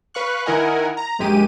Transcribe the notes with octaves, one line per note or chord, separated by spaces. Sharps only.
B4 F5 C#6 F#6
D#3 E4 A#4 D#5 F#5 G#5
A#5
A#1 F#2 G#3 G4 D#7